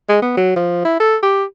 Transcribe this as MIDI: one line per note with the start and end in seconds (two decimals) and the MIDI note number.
0.09 0.21 56
0.22 0.33 59
0.37 0.53 54
0.56 0.82 53
0.85 0.99 64
1.00 1.17 69
1.23 1.44 67